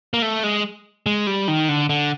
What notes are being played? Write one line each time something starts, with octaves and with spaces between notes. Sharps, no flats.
A#3
A3
G#3
G#3
G3
D#3
D3
D3